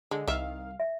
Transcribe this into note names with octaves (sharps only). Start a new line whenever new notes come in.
D3 G#3
C2 D#3 E5 F5
E5